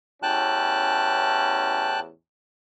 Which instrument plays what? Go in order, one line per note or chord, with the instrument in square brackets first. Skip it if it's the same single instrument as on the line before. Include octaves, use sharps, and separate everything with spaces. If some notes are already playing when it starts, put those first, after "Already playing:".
[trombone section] A1 E2 C#4 [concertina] G5 A5 F#6